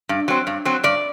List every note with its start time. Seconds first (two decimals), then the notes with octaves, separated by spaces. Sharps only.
0.09 G2
0.28 F#3 C4
0.47 G2
0.65 F#3 C4
0.84 G2 D5